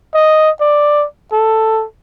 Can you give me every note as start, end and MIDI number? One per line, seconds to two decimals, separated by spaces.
0.14 0.50 75
0.61 1.06 74
1.33 1.85 69